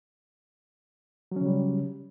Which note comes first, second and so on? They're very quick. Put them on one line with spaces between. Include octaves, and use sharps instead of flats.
F#3 C#4 C#3 G3